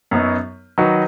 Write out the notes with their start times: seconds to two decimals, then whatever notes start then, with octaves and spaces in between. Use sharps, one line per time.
0.11 F#2 F#3 B3 D#4
0.78 D#3 F#3 D#4 F#4 B4